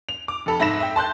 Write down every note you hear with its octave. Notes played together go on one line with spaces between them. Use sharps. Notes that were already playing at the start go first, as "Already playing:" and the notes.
F7
D6
F1 A4 B5
G#2 E5 B5 A#6 E7
E5 G5
A5 C6 F#6 G6